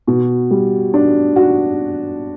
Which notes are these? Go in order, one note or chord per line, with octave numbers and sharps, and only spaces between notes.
B2
G3
D4
F#4